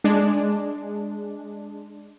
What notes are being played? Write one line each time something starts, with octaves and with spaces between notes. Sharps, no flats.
G#3 D4